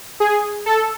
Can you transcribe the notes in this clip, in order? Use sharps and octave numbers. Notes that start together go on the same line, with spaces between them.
G#4
A4